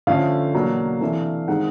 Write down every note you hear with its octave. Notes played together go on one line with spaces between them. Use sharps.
D3 F3 A3 C#4 F5
E2 B2 F#3 A#3 D4
C3 E3 A3 D4
D#3 G#3 C4 D#4 F#5